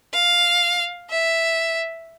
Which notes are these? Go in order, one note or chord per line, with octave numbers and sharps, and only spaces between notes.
F5
E5